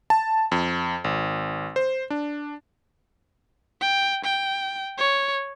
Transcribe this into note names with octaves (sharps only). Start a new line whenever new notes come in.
A5
F2
G#1
C5
D4
G5
G5
C#5